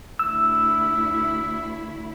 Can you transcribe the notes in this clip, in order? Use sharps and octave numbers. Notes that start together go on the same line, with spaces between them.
D2 E4 E6